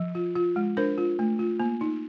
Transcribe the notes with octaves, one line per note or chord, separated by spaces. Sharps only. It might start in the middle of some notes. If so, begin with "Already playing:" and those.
Already playing: F3
F4
F4
G#3
D4 A#4 C5
F4
A3
F4
A#3
D#4